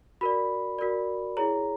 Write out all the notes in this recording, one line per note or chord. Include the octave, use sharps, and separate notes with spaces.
F#4 A#4 D5 B5
F#4 A#4 D5
E4 G#4 C#5 A#5